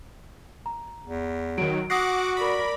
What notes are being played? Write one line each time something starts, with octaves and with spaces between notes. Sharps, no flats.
A#5
E2
D#3 F#3 F#4 D7
F#4 F#5 D6 D#6 A#6 C7
A#4 D5 B5